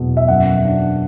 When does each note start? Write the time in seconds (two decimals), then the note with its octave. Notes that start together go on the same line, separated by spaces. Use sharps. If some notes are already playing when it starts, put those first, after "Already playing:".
Already playing: E2 B2 F#3 B3
0.17 E5
0.28 F#2 F#5
0.65 D4